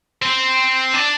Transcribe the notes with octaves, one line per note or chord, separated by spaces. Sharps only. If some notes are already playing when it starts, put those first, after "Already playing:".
C4
D4